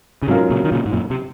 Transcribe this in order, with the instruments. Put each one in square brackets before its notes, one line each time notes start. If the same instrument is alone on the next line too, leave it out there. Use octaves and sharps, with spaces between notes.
[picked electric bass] C#3
[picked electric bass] G#2 C3 [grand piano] F#3 C#4 F4 A#4
[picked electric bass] A#2 C#3
D#3
A#2 C#3
G#2
F#2 A#2
C3